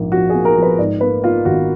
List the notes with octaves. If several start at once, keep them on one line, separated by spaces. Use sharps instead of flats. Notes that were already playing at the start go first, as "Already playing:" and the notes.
Already playing: A#1 G#2 A#3
F3 F#4
A#3 G#4
A#4
F3
B4
G#2 D5
A#3 B4
A#3 F4
G#1 F#4